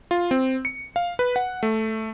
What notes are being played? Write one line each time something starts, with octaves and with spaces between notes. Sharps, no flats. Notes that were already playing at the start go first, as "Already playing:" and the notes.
F4
C4
C#7
F5
B4
F#5
A3